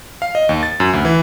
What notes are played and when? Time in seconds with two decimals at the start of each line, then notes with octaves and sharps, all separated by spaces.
0.22 F5
0.35 D#5
0.49 D#2
0.63 A6
0.80 F#2
0.93 D2
1.05 E3